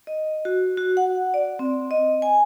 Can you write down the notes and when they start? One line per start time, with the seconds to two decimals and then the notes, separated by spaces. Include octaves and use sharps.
0.07 D#5
0.45 F#4
0.77 F#4
0.97 F#5
1.34 D5
1.59 C4
1.91 D#5
2.22 G#5